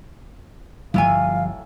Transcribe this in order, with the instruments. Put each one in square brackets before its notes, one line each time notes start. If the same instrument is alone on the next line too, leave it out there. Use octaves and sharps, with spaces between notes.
[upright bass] G1 F3 [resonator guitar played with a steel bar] A2 F#3 G#5 [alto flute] F5